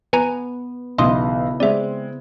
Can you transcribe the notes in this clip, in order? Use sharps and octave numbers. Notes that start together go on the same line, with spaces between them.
B3 B4 G#5 A#5
B1 C#3 E3 B3 E4 D#5 C6 D#6
G#3 C4 D5 E5